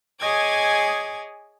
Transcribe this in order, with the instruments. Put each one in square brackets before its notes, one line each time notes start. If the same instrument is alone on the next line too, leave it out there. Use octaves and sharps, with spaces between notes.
[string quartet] G#4 C#5 D#5 G#5 D6 G#6